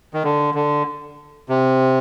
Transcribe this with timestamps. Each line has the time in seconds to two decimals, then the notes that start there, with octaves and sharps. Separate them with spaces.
0.14 D#3
0.24 D3
0.54 D3
1.49 C3